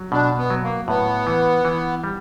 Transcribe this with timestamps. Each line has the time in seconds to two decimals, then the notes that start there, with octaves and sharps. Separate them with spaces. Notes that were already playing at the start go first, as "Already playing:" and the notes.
Already playing: F#3
0.12 B2 D4
0.37 B3
0.50 F#3
0.63 A#3
0.88 A2 B3
1.27 E3
1.65 E3
2.04 G3